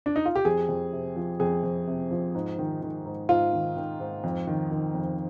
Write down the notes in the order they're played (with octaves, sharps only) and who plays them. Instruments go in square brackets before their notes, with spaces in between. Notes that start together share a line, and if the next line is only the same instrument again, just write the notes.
[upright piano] D4
D#4
F4
G4
F2 G#4
F2
C3
F3
F2 G#4
F2
C3
F3
G#2
D#3
D#3
G#2
G#2 F4
D#3
D#3
G#2
F2
D#3
D#3
F2